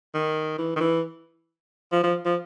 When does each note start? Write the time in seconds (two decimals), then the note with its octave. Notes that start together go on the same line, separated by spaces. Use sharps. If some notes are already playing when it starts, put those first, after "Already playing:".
0.14 D#3
0.58 E3
0.76 D#3
0.80 E3
1.92 F3
2.03 F3
2.25 F3